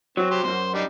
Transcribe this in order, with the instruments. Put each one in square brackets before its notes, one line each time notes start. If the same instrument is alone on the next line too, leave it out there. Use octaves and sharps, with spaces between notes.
[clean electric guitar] F#3 [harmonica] C4
[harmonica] G4 C5
[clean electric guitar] B1 F#2 [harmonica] C5
[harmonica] G3 D4 D#4